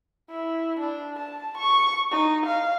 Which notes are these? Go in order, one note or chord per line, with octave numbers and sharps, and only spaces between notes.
E4
D4
A5
C#6
D#4
F5